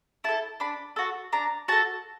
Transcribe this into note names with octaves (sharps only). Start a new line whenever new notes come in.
E4 A4 A5
D4 B5
F#4 A4
D4 A#5
F#4 A4 A5